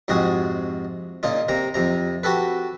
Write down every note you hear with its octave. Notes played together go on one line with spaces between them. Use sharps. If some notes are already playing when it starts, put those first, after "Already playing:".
F2 G#2 C3 F#4 G#4
A#2 C#3 D#4 F4
C3 A#3 A#5
F2 C3 A#5
F#4 G4 A4 B4